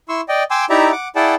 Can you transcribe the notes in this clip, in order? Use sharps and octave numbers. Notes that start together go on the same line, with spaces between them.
E4 C6 C#6 E6
D5 D#5 G5
G5 G#5 C6 D6 E6
D#4 E4 G4 D5 E5 A#5
F#5 D6
E4 G#4 D5 F#5 G5 A5